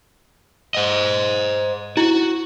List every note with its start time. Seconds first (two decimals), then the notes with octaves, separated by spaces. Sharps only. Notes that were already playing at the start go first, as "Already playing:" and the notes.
0.75 C5 D#5
1.97 E4 F#4